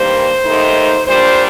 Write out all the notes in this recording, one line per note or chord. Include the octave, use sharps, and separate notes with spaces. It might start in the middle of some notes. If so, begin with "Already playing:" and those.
Already playing: G2 D#3 G3 A#3 C5
D#2 D#3 A3 D#4
A#2 G3 D4 C5